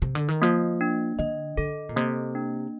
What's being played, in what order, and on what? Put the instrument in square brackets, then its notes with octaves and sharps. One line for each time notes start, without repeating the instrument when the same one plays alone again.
[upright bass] C3
D3
D#3
[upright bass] F3 [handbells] A#3
[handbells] D4
[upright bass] D3 [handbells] D#5
[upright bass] D3 [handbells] A4
[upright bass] A#2
[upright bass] C3 [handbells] A#3
[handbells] D4